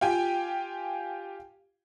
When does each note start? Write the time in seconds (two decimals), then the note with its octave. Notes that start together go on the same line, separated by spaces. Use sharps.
0.01 F4 G4 G5 G#5